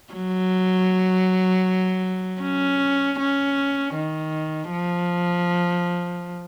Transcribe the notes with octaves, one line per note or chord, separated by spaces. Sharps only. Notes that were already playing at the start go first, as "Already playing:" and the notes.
F#3
C#4
C#4
D#3
F3